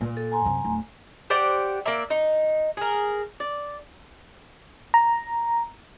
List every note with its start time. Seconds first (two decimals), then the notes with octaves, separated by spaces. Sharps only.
0.01 A#2
0.17 A4
0.32 G#5 A#5 C6
0.45 F#2 C3
0.64 D1
1.30 G4 C5 D5 F#5
1.85 A#3 D5 E5
2.10 D#4
2.77 G#4 A#4
3.40 D5
4.94 A#5